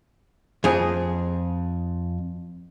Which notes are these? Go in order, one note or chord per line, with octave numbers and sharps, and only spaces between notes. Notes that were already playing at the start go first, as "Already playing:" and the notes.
F2 G#4